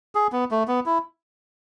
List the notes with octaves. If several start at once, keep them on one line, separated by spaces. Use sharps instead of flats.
G#4
B3
A3
B3
E4